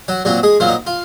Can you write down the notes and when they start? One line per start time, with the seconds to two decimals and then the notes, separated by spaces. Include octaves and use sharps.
0.08 F#3 F#4
0.25 A#2 F#3 C4 F#4
0.43 G#3 G#4
0.60 A#2 F#3 C4 F4
0.68 D#4
0.87 F4